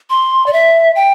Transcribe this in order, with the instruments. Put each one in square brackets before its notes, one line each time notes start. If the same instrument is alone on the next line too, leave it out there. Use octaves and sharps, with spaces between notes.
[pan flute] C6
D5
E5
G5